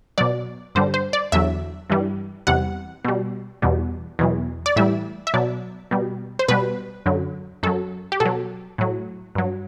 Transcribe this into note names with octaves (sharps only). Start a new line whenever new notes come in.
B2 F#3 D5
G2 D3 G3 C5
C5
D5
E2 D3 F#3 E5
G2 E3 G3
E2 C3 G3 F#5
B2 G3
E2 B2 G3
E2 B2 F#3
D5
A2 E3 G3 E5
E5
B2 F#3 D5
B2 G3
C5
B2 G3 B4
F#2 D3 F#3
F#2 F#3 A4
G4
B2 A4
F#3
A2 F#3
G2 F#3